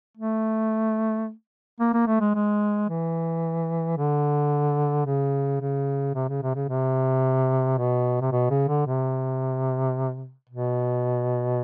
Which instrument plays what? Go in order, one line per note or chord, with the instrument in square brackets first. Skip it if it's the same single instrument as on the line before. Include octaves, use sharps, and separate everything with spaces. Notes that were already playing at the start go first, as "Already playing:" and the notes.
[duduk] A3
A#3
A#3
A3
G#3
G#3
E3
D3
C#3
C#3
C3
C#3
C3
C#3
C3
B2
C3
B2
C#3
D3
C3
B2